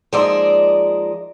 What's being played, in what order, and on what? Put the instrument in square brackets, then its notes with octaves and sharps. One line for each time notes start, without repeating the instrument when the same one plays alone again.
[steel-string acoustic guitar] F3 G#3 A#3 D#4 D5 E5